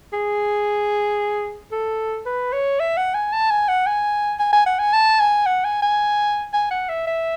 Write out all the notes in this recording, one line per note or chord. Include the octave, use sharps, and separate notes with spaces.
G#4
A4
B4
C#5
E5
F#5
G#5
A5
G#5
F#5
G#5
G#5
G#5
F#5
G#5
A5
G#5
F#5
G#5
G#5
G#5
F#5
E5
E5